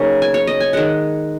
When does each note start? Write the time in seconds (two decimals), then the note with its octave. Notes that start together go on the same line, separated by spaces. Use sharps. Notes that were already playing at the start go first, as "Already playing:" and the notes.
Already playing: C#3 F#3 A#3 D#4
0.22 G#5
0.34 C#5
0.47 D#5
0.60 G#5
0.73 D#3 G#3 F#5